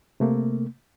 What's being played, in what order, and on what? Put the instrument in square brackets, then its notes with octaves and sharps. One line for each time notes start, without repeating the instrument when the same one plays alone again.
[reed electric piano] C3 A3 A#3